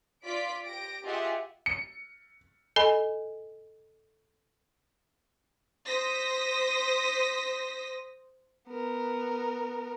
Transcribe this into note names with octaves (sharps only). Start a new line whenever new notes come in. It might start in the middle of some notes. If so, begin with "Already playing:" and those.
F4 D5 B6 D7
G4 A#6 D7
F4 G4 G#4 D#5 E5 F#5
C#7
A4 D#5 G#5 B5
C5 D#6 A#6 B6
B3 A#4